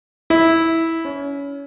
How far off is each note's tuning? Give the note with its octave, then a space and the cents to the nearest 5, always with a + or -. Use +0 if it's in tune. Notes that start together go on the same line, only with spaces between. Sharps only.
E4 -10
C#4 +25